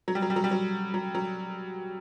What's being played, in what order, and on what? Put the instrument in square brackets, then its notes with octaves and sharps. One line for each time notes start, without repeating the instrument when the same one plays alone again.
[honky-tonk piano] F#3
G3
F#3
G3
F#3
G3
F#3
F#3
F#3